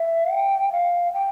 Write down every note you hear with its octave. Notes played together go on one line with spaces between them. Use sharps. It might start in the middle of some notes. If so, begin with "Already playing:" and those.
Already playing: E5
G5
F5
G5